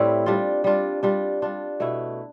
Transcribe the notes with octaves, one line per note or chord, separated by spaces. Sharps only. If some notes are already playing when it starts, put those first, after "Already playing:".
Already playing: A2 G3 C4 E4
G3 D4 F4
G3 D4 F4
G3 D4 F4
G3 D4 F4
B2 A3 E4